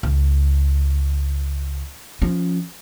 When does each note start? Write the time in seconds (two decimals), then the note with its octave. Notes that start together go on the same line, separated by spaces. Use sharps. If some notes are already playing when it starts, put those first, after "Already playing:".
0.03 C#2
2.22 F3 C#4